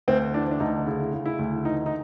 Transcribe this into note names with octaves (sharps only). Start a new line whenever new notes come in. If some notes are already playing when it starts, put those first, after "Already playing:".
D2 C4
E3 D4
D4
D2 D#4
C#3 E4
C#3
E4
D2
E3 D#4
D#4